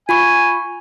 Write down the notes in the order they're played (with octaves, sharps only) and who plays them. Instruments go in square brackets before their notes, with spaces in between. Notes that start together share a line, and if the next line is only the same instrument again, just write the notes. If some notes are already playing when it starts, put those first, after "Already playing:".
[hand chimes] F4 B5 C#6 [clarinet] G#5